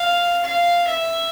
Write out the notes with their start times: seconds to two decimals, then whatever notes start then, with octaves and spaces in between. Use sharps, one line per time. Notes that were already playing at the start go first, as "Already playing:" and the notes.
Already playing: F5
0.44 F5
0.88 E5